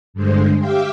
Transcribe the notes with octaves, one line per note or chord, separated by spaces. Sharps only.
G2 D3 G#3 C5
G4 E5 F5 G5 D6